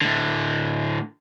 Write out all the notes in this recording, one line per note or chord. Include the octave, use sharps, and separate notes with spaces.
A2 D3